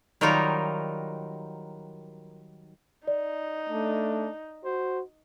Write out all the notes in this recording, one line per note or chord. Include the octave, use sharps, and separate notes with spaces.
D#3 F#3 G3 D#4 F4 A#4
D#4 D5
A3 D4
F#4 C5